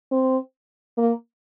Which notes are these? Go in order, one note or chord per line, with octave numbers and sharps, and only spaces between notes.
C4
A#3